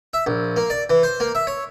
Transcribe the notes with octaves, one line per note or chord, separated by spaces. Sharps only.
E5
A#1
A#3
D5
E3
C5
A#3
E5
C#5